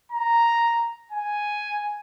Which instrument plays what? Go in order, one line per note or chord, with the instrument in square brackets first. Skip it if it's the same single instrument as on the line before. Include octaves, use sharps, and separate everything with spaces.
[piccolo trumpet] A#5
G#5